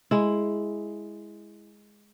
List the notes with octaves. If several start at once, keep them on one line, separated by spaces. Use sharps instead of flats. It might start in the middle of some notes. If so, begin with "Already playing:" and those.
G#3 E4